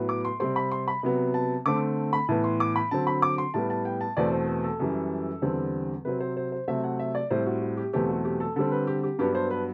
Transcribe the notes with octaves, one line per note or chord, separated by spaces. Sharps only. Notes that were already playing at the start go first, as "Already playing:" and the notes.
Already playing: A2 F#3 B3
D6
C6
C3 G3 C4 C6
B5
C6
B5
C3 F#3 B3
A5
D3 A3 C4 D6
B5
A2 E3 B3 A5
C6
D6
B5
D3 F#3 C4 A5
B5
D6
C6
A2 G3 B3 A5
A5
G5
A5
E2 B2 A3 C4 D5
C5
A4
A4
F#2 E3 G3
E2 D3 G3 C4
C3 F#3 C4 B4
C5
C5
C5
C3 F#3 A3 C4 E5
F#5
E5
D5
A2 G3 C4 C5
F#4
F#4
G4
E2 B2 F#3 A3 C4 G4
F#4
G4
A4
D3 G3 C4 A4
B4
G4
G4
G2 F#3 B3 D4 G4
C5
B4